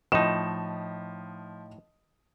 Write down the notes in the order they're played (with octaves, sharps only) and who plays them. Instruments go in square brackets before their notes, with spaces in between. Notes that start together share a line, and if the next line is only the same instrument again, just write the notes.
[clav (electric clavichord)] A2 D#4 [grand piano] F3 [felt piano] D#5 E7